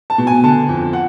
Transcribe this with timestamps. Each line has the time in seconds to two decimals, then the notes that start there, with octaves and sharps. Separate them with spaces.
0.10 A5
0.18 B2
0.27 G#5
0.43 D3 A5
0.69 F2
0.93 F#5